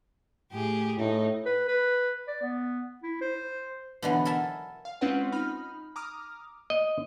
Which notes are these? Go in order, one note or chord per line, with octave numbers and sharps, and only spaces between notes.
A2 G4 G#4
A2 D#4
B4
B4
D5
B3
E4
C5
B2 D3 E3 F#3 B3
A4 A#4 D#5 E5 G#5 A5
F5
G#3 C4 C#4 F4 B4 F#5
D#4 B5 F6
A#5 D6 D#6 F6
D#5